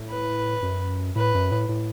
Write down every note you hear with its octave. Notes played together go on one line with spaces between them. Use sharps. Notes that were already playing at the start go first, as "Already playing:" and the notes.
Already playing: A2
B4
F#2
A2 B4
F#2
A2
A2